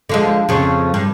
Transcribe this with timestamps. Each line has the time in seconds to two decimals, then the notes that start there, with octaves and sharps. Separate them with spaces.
0.09 D3 F3 G#3
0.49 F2 C#3
0.94 G2